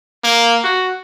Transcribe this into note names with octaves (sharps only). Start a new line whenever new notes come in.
A#3
F#4